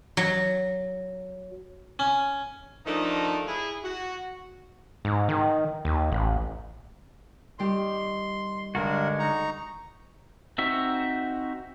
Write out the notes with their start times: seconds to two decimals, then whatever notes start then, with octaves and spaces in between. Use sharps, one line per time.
0.17 F#3
1.99 C#4
2.86 D#3 F3 A3 D4 D#4
3.47 E4 G#4
3.83 F#4
5.05 G#2
5.29 D#3
5.85 D#2
6.12 A1
7.59 D#3 G3 G4 C6
8.75 G2 D3 G#3 F#4 A#4
9.19 D#4 A#5 C#6
10.58 C4 D#4 F#4 E5